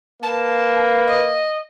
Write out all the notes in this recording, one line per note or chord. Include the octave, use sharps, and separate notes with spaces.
A#3 B4 A5
D#5